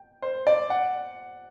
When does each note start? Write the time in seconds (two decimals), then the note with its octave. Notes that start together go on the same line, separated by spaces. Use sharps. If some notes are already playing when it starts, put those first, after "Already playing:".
Already playing: G5
0.22 C5
0.47 D5
0.70 F#5